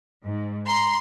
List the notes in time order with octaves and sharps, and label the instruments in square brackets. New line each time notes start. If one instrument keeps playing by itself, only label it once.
[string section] G#2
[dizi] A#5 [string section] C6